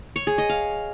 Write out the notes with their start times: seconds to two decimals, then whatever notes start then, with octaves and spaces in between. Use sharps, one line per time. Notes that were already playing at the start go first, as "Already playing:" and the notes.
0.16 C#5
0.27 G#4
0.38 D#5
0.49 F5